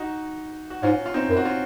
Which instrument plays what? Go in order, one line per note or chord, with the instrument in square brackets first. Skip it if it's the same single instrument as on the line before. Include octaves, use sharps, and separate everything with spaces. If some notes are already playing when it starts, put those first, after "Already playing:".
Already playing: [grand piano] D#4 F#4
F#4
[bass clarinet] G#2 [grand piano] C#4 F4
[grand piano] F4
C4 D#4
[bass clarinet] F#2
[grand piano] F#4
C#4 F4